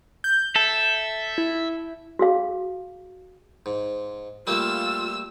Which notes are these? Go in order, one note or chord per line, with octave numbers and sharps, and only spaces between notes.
G6
A4 E5
E4
F#4 G#4 F5
G#2
G3 A3 A#3 F4 E6